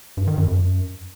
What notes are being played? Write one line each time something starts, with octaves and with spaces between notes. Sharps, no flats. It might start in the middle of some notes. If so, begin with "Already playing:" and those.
G2
D#3
F#2
F#2